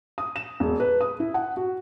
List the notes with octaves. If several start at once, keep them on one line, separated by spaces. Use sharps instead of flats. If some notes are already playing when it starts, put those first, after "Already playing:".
D#6
E7
E1
B4
D#6
E4
F#5
F#4